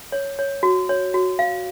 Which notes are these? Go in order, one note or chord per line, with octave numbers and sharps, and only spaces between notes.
C#5
C#5
F#4
C#5
F#4
F5